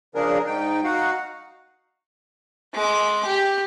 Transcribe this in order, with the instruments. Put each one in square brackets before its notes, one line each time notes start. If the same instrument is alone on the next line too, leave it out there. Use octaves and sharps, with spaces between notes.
[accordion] C#3 F3 D4 G#4 A#4
G#2 D#4 G5
D#4 F#4 F5 F#5
[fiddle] G#3 D6
G4